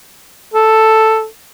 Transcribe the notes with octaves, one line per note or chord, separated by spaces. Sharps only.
A4